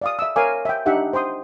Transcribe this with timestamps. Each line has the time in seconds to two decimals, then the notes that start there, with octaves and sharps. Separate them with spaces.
0.02 D5 F5 D#6
0.19 E5 E6
0.36 A#4 C#5 F5 G#5 D6
0.65 E5 G5
0.86 D4 D#4 G4 E5 F#5 G5
1.13 C5 G5 C6 D#6